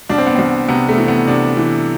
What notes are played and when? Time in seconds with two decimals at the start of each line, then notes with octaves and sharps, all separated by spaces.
0.10 C2 D4
0.18 C4
0.27 B3
0.35 C2 C4
0.68 C3 B3
0.89 A3
0.98 E3
1.08 B3
1.27 C3 D4
1.57 E3